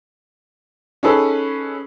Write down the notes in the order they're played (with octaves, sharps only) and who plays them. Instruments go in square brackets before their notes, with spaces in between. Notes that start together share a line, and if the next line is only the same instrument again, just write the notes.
[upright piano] C#4 D#4 G#4 A4 B4